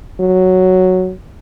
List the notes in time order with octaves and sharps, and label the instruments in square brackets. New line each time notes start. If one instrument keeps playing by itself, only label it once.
[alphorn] F#3